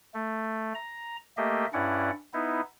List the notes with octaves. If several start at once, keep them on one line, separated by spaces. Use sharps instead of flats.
A3
A#5
A3 A#3 G4 D#5 E5
G2 C#4 E4 D5 F#5
B3 D#4 E4